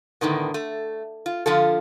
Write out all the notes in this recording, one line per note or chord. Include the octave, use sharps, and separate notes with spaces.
A2 D3 D#3 B3
A3
F4
D3 F3 F4 A4